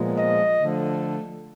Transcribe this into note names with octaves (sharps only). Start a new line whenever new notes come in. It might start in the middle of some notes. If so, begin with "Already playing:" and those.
Already playing: A#2 F3 G#3 B3
D#5
D3 F3 A3